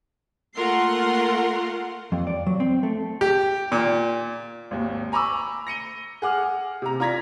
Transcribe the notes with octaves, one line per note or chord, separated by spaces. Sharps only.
A3 A#3 F4 A#4 F#5 C6
F2
D5
F#3
C4
A3
G4
A#2
G#1 D#2
G#5 A#5 B5 C#6 D6 E6
A#6 C#7 D#7 G7
G#4 F#5 D6 F6
C3 A#5
F4 D5 A#5 G#6 A#6 B6